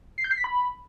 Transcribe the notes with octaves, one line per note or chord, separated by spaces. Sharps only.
C7
G6
C7
B6
B5